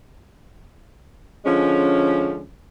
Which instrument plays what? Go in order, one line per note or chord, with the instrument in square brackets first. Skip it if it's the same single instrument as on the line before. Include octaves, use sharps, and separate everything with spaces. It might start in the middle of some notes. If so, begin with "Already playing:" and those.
[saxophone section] D3 F3 G#3 C#4